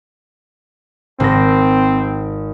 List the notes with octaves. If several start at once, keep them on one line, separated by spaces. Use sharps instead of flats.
G#1 C4 A#6